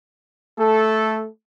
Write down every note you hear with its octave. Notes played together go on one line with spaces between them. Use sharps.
A3 A4